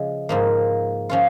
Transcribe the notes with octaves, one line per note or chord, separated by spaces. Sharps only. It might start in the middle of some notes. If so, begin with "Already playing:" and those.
Already playing: C#3 F3 G#3
G#2 F3 A#3
F3 C#4 F4